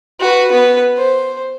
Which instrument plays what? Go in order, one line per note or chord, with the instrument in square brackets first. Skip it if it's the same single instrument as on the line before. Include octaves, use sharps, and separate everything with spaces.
[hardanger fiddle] F#4 B4
B3 B4
C5